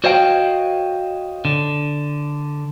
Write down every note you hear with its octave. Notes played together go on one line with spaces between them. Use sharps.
F#4 C5 C#5 D#5 F5 G5
D3